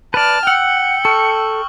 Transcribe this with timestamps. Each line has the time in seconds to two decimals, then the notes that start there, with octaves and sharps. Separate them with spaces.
0.14 B4 D5 A5 F6
0.47 F#5 G5 E6 C#7 F#7
1.05 A4 C#6 F6